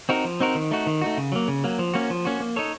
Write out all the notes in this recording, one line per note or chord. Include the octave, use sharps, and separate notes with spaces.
C4 D#4 F#4 A#4
F3
C4 D#4 F#4 A#4
D#3
A3 D#4 F#4
D#3
A3 D#4 F#4
C#3
F#3 A#3
C#3
F#3 A#3
F3
A#3 C#4 F#4
F3
A#3 C#4 F#4
A#3
D#4 A4 C#5